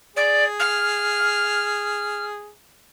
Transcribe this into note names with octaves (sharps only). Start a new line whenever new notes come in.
G#4 D5
F6